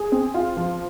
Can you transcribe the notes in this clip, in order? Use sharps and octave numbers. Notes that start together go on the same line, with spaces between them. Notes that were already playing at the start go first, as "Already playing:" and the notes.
Already playing: G#4
C4
F4
F3